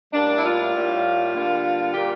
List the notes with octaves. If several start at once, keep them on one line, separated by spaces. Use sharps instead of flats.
A2 G3 A#3 D4
E4
F4
A2 G3 A#3
D3 G3 A#3
A#2 G3 A#3 G4